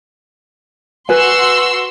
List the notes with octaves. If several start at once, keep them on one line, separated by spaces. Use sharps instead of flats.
F#4 B4 G#5 C6 E6